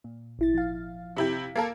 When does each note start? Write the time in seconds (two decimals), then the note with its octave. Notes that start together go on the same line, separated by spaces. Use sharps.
0.04 A#2
0.39 G#1 E4 A6
0.54 F3 F5
1.17 C3 E4 G4
1.56 A#3 A4 A#4